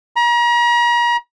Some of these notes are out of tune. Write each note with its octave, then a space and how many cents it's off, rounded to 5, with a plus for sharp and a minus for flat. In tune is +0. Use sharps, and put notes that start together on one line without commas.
A#5 +40